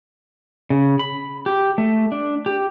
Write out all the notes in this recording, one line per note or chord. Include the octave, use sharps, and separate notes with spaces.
C#3
B5
G4
A3
D4
G4